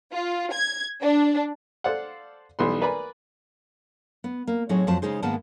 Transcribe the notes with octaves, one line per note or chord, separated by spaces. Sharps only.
F4
G#6
D4
A4 C5 D5 F5 F#5
B1 E3 G3 B3 C6
A#4 B4 D5 G#5 A#5 B5
B3
A#3
A2 F#3 C4 D#4 G#4 C#5
F2 F#3 C4 C5 A5
C#3 G#3 D#4 G#4 C5
G#2 D#3 G#3 A#3 B3 A5